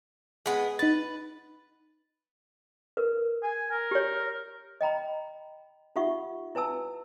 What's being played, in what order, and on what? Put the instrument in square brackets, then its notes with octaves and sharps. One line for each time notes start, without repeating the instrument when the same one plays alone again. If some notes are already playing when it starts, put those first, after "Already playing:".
[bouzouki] G#3 B3
[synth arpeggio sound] D#4 A6 [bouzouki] B4
[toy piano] A#4 B4
[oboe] G#5
A#4
[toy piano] G4 C#5
D#5 G5 A#5 B5
D#4 F4 G4 E5 F#5 C#6
E4 B4 G#5 A5 E6